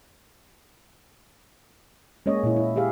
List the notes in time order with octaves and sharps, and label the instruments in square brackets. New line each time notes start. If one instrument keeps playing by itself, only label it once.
[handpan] G#3 A#3 C#4 C#5 D#5
A#2 E4
E4
G4 G#4 E5 F5